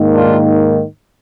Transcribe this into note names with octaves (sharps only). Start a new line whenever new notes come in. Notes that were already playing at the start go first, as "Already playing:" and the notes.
Already playing: G#2 D#3 A#3
D4 F4